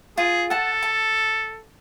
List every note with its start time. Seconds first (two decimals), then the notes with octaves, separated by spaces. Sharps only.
0.18 F4 G#4
0.50 A4 F#5 A5
0.83 A5